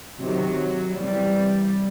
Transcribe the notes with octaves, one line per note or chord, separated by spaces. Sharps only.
C3 D#3 F#3
C3 E3 G3